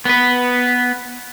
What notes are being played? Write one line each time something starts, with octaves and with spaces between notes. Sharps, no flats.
B3 B4